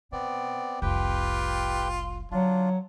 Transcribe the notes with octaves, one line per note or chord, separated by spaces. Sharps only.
B2 B3 C4 D5
F1 C2 F4 G4 B4 G5
D3 F#3 D4 F4